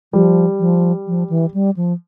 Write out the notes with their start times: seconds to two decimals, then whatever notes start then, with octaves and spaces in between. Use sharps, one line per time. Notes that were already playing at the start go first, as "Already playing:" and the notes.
0.13 F3 G3
0.59 F3
1.07 F3
1.30 E3
1.54 G3
1.77 F3